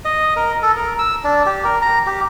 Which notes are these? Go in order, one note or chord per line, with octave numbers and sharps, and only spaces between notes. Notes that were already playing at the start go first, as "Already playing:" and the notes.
D#5
A#4
A4
A#4
E6
D4
G4
A#4
A#5
G4